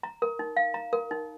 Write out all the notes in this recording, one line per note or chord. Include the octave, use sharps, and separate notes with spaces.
A#5
A#4
D#4
F5
A#5
A#4
D#4